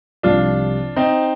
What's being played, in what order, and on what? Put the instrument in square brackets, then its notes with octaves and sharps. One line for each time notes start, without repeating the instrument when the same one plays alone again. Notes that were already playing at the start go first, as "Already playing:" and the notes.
[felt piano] C2 C3 F3 [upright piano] D4 F4
[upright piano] C4 D#4